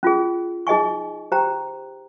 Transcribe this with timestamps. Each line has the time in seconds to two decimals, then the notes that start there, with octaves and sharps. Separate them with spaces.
0.03 C#4 F4 G#4
0.67 D#4 G#4 D#5 G#5 C#6
1.32 G4 C5 G5 A#5